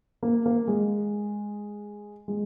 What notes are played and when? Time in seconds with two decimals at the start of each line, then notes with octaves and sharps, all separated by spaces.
0.23 A#3
0.46 A#3
0.68 G#3
2.28 G#3